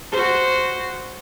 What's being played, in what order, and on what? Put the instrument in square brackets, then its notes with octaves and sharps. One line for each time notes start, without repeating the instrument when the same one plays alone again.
[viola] F#4 C5